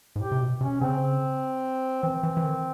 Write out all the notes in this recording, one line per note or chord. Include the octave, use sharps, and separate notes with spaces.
G#2
A2 G4
C3
B2
C3 C#4
C#3 C4
E3 C4
E3
E3
D#3